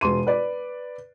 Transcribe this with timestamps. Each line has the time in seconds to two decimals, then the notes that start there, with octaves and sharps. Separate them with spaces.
0.01 E1 C6 D#7
0.27 B4 D5